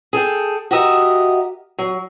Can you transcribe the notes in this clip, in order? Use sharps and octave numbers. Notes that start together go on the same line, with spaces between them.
G#4 A4 G5
F#4 G4 A#4 D#5 E5 F#5
F#3